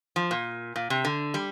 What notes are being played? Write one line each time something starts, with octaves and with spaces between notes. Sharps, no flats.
F3
A#2
A#2
C3
D3
G3